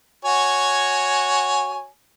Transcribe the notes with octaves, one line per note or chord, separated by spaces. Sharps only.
F#4 C#5 G#5